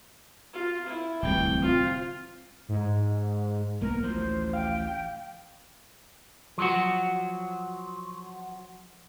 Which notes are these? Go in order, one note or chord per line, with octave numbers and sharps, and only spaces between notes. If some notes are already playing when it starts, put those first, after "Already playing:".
F4
E4
D1 C2 E3 G5
C4 F4
G#2
B1 A#3 B3 A#4
A1 D2 F3 C5
F5 G5
F3 F#3 F#4